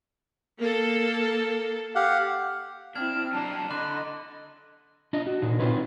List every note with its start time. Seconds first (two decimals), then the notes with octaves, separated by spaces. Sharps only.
0.58 A#3 A4
1.95 G4 F5 F#5
2.96 C4 D4 E4 F6 G#6
3.33 F#3 A#3 D4 D#4 A5
3.71 D3 D#5 B5 C6 D6 F#6
5.13 D4 F4 D#5
5.27 F#4
5.42 A#2 D4 D#4
5.59 C4 D4 D#4 F4 B4 C#5